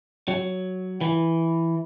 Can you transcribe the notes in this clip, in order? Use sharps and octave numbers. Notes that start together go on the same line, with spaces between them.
F#3
E3